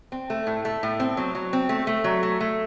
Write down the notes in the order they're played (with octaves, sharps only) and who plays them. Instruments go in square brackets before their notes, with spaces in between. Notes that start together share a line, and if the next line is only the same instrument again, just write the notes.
[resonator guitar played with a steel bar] C4
A3
A2
A3
A2
C4
F#3
F#3
C4
A3
A3
F#3
A3
A3